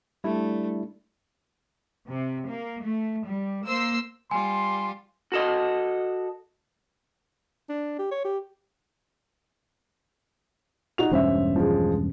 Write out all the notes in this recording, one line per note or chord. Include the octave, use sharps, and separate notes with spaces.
G3 A3 D4 E4
C3
A#3
A3
G3
A#3 C5 E6 C7
G3 F4 G#5 C6
F#4 A4 D#5
D4
G4
C#5
G4
D#4 F#4 F7
E1 G2 C#4 C5 E5
F3 G#3